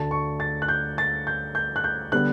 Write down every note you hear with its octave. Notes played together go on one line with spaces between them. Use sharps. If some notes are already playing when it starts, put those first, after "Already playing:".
Already playing: D2 D3 A3 A5
C#6
A6
F#6
G6
A6
G6
G6
F#6
G6
D3 G3 B3 F#6